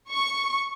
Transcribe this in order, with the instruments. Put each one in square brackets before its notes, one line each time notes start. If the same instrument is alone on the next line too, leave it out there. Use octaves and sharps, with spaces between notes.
[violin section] C#6